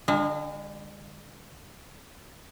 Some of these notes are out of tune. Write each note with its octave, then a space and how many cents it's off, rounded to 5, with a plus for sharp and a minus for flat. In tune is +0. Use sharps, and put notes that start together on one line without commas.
D3 +10 G#3 -40